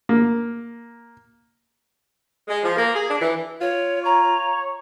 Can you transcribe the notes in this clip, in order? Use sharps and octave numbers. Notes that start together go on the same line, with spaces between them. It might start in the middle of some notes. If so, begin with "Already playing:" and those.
A#3
G#3
F3
A#3
G#4
D4
E3
F4 C#5
C#5 A#5